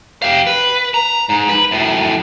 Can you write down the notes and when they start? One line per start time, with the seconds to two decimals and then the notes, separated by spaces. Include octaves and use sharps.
0.22 G4 F5
0.47 B4
0.94 A#5
1.29 G#2
1.49 B4
1.71 F#2 A2